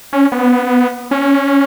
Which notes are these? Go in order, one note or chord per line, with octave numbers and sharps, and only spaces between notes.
C#4
B3
C#4